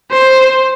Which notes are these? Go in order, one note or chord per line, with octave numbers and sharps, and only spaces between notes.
C5